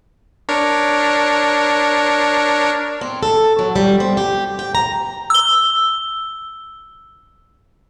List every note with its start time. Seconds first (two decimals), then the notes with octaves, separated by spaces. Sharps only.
0.49 D4 A#4 C#5
3.01 C4
3.23 A4
3.59 F#3
3.76 G3
4.00 C4
4.17 G4
4.59 G5
4.75 A#5
5.30 E6 G7